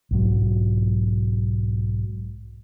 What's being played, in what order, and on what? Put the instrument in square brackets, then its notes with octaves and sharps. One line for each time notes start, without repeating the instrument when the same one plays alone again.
[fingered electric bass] B1 G#2 F#3